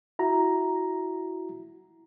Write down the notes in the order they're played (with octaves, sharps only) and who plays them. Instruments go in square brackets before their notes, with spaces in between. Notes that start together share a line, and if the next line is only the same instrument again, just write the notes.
[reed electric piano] E4 F#4 A#5